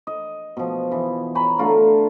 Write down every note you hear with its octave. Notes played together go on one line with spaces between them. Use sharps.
D#5
B2 F3
E3
C#5 G#5 A#5 B5
D3 A3 F4 A#4